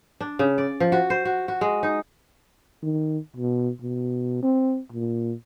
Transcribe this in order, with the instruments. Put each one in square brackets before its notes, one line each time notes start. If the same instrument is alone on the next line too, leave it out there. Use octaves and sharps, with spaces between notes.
[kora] D4
C#3
D5
F3
F#4
C5
F#4
F#4
G#3
D#4
[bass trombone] D#3
B2
B2
C4
A#2